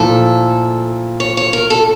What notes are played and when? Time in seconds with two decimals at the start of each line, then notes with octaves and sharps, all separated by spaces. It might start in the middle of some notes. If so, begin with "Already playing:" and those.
Already playing: A#2 F3 A3 E4 A4
1.20 C#5
1.37 C#5
1.53 A#4
1.70 A4